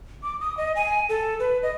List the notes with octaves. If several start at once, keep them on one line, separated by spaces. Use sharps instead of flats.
D6
D#6
D#5
G#5
A4
B4
D#5